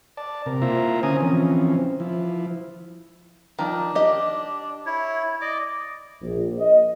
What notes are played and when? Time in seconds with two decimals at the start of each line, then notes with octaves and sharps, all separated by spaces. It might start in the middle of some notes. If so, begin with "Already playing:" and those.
0.17 D5 A5
0.46 C3 A#4
0.62 A#3 E4 F4 C5 E5 A#5
1.03 D3 C#4 G#5 A#5 D#6
1.21 E3 F3 C4 C#4
2.00 F3 E4
3.59 D#3 F3 D4
3.95 G4 D#5
4.86 E4 C#5
5.41 D5 D#5 D6
6.22 A#1
6.58 D#5